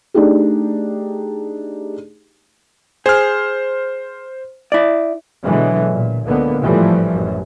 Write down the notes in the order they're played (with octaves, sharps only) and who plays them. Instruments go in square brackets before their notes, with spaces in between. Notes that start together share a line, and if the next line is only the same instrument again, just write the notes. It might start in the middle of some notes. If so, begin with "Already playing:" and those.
[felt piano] A3 D4 D#4 G4 G#4
[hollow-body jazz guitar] G#4 [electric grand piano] C5 F6
[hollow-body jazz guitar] E4 D5
[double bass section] B2 D3 E3 F#3 G#3
A#2
C#2 D3 A#3 B3
G#1 A2 E3 F3 G3 A3
A1 F#2